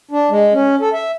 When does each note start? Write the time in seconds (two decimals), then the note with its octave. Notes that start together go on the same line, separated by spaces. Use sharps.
0.11 D4
0.31 G#3
0.53 C#4
0.81 A4
0.93 E5